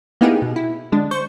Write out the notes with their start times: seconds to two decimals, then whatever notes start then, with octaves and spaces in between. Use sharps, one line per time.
0.21 A#3 B3 D#4 E4 G4 G#4
0.42 B2
0.56 E4
0.92 D3 G#3 D4
1.11 C5 C#6 G6